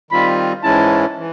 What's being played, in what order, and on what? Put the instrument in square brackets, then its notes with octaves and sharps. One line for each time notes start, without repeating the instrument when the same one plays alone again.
[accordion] D#3 G3 C4 F4 [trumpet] B5
[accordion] G#2 E3 G#3 C#4 E4 [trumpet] A5
[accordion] E3